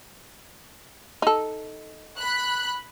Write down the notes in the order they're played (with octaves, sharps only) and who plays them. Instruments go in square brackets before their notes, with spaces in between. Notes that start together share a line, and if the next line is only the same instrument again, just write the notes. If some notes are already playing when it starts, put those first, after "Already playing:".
[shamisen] D#4 A4
[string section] B5 F#6